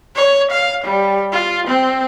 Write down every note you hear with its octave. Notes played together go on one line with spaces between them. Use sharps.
C#5
F5
G3
F4
C4